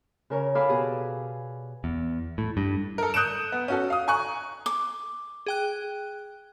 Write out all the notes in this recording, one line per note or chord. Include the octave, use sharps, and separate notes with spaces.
C#3 A#4 C#5
A4 D5 F5 G#5 B5 E6
B2 G4 G#4
E2
A2
G2
A4 A#4
D#6 F#6 G6 C#7 D7 E7
B3
C#4 F#4 A4
F5 D#6
G#5 A#5 C#6 F#6
D6
G#4 G5 F#6